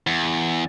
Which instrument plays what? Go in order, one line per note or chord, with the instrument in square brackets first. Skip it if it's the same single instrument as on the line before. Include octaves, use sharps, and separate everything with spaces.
[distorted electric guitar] E2